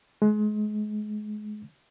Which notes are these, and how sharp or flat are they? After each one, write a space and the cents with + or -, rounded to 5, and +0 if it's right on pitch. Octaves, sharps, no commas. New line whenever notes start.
G#3 +30